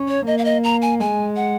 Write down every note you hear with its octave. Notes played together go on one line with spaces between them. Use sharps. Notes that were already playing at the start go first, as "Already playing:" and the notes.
Already playing: C#4
C#5
A#3 D#5
F5
D#5
A#5
G#5
G#3 G#5
F#5